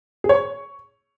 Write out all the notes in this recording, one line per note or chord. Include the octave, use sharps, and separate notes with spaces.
G#4
C#5
C#6